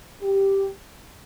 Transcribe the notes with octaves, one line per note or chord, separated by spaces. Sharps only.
G4